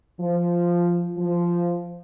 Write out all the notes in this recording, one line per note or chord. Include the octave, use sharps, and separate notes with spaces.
F3
F3